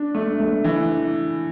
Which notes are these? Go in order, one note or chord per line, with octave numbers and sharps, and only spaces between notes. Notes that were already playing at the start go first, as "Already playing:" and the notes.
Already playing: D4
A3
A3
E3